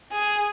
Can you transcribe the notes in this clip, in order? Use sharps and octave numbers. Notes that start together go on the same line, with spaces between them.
G#4